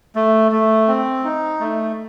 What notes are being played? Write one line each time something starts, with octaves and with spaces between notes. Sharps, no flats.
A3
A3
C4
D#4
A3